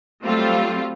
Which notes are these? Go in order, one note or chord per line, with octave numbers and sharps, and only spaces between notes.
F#3 G3 A3 C4 F4